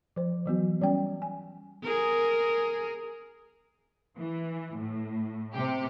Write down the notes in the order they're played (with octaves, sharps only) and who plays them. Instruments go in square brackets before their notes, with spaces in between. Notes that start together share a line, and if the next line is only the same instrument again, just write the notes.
[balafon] F3 C5
E3 F#3 B3 F#4
G3 C#4 G5
G#5
[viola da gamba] G#4 A#4
[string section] E3
A2
C3 G4